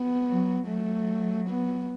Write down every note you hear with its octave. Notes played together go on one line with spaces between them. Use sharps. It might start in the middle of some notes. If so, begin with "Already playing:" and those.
Already playing: B3
F#3
F#3 A3
B3